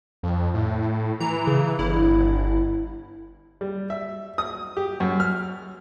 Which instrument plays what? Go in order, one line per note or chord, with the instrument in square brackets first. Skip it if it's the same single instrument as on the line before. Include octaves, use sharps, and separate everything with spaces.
[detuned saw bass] F2
A2
[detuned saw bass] E3 [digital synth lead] A#5
[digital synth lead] C#3
[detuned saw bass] G1 [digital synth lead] E4
[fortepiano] G3
E5
D#6
G4
F#2
F6